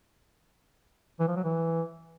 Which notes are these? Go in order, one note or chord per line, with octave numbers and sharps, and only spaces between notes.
E3
F3
F#3
E3